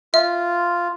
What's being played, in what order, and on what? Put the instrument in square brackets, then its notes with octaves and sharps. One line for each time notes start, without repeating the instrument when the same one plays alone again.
[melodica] F4 [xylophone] E5